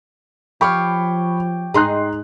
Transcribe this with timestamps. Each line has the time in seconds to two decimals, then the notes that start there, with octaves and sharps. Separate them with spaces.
0.61 F3 G4 C#5 F5 B5 C#6
1.74 G#2 D#4 G#4 A#5 C6 F#6